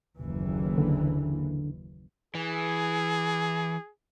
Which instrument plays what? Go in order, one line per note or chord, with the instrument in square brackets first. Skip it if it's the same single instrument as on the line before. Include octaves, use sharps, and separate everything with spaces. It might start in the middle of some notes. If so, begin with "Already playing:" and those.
[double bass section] F#1 D#2 E3
[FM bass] D3
[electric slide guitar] E3 [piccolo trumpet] G#4